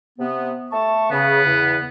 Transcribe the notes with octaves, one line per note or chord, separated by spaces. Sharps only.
C3 B3
A3 A5 C#6
C#3 B3
E2 C#3